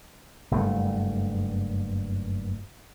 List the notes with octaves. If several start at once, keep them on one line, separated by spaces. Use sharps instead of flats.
F#1 G2 A3